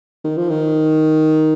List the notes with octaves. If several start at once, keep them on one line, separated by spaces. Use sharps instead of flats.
D#3
F3
D#3